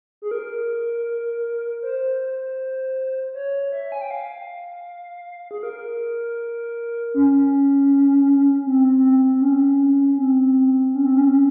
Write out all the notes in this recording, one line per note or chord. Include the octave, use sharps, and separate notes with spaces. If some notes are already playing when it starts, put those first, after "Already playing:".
G#4
A#4
C5
C#5
E5
G#5
G5
F5
G#4
A#4
C#4
C4
C4
C#4
C4
C#4
C4
C#4